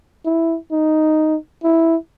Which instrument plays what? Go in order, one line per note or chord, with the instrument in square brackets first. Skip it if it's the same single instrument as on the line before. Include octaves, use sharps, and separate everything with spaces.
[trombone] E4
D#4
E4